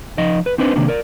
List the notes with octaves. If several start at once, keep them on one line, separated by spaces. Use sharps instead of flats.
F3 D#4 D#5
B4
C4 D4 D#4 B4 C5
C3 D#3 A#3 D4
A#4 D5